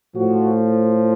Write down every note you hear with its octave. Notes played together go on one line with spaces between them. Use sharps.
A2 F3 F#4